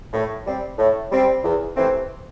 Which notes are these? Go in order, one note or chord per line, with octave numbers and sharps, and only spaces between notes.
A2
G3 C4
A2
G3 C4
E2
C3 E3 A3 C4